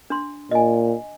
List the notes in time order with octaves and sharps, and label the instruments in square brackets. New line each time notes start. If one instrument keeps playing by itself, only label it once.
[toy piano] D4 C6
[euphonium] A#2 [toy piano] D#5 G#5